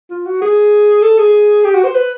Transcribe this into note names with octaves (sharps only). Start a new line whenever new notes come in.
F4
F#4
G#4
A4
G#4
G4
F#4
C5
B4